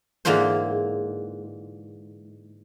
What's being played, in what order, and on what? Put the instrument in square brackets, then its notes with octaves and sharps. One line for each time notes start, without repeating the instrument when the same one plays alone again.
[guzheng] G#2 D3 E3 A#3 F4 C5